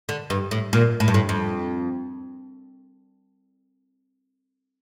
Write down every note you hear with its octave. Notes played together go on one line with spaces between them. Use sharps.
D3
G2
A2
A#2
A2
G2
A2
F2